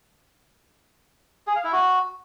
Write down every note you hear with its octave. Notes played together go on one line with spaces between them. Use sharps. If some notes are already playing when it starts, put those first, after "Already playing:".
G#4
F5
E4
F#4